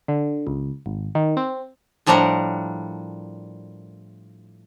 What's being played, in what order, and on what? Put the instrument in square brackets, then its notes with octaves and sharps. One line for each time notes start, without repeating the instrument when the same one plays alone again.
[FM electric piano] D3
C#2
G#1
D#3
C4
[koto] A2 F3 G3 D4 A#4 F#5